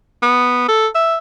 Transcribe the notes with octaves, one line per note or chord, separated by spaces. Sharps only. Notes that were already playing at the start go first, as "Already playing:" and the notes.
B3
A4
E5